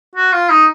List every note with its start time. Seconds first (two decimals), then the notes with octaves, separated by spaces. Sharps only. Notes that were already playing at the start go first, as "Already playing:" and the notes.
0.15 F#4
0.32 F4
0.50 D#4